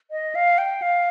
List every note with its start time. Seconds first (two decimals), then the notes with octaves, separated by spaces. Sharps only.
0.11 D#5
0.35 F5
0.58 G5
0.82 F5